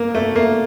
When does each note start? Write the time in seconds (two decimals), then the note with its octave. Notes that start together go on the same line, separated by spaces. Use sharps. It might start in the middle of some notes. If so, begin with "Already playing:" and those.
Already playing: A#3
0.15 A3
0.36 A#3